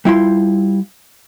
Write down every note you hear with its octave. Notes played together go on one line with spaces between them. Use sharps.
G3 E4 F4 C6